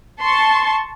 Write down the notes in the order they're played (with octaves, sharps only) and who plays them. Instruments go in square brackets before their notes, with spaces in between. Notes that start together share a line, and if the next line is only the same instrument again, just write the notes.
[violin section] A5 C6 C#6